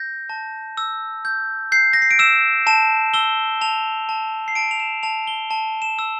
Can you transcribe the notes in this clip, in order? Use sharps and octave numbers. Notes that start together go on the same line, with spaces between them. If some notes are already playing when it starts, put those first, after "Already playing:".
Already playing: G6 A#6
A5
E6
G6
G6 C7
A#6
C7
D7
E6 E7
A5 E7
E6 G7
A5 F7
A5
C7
A5 D7
F7
E7
A5 F7
G7
A5
E7
E6